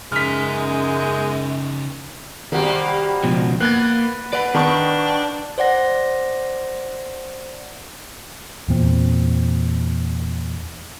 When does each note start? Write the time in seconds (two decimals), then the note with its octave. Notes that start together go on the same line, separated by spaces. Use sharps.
0.12 F#2 C#3 G#3 D#4 F6 B6
2.52 C3 D#3 G3 A#3 F#4
3.23 C#2 B2 F3
3.60 A#3 B3 F#6 G#6 A6
4.33 B4 D5 F#5
4.55 D#3 D4 C#6
5.58 C5 D5 F#5 A#6
8.69 E2 A#2 C4